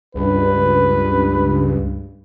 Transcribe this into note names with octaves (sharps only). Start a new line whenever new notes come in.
C#2 G2 B4